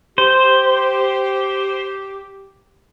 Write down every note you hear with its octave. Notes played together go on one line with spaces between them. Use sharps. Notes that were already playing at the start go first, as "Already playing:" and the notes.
G4 C5